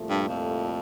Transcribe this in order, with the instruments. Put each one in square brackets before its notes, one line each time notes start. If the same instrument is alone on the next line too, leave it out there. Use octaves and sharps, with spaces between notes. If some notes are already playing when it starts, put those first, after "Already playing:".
Already playing: [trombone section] C2 A#2 F3 A3
[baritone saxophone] G2
F2